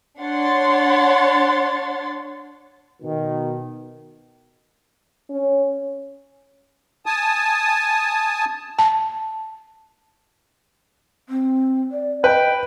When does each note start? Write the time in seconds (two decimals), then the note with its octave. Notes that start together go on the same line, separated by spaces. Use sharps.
0.19 D4 C#5 F#5 C6 A6
3.01 B2 D#3
5.30 C#4
7.06 G#5 A5 D#6
8.79 A5
11.29 C4
11.91 D5
12.24 B4 D#5 G5